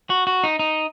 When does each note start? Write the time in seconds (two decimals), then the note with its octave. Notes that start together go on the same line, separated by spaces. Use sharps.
0.10 F#4
0.27 F#4
0.44 D#4
0.59 D#4